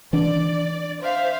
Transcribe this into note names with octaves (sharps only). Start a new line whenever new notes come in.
E3 D4 D5
C5 E5 F5